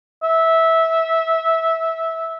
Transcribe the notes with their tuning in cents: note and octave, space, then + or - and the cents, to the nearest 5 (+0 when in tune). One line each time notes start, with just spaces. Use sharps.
E5 -15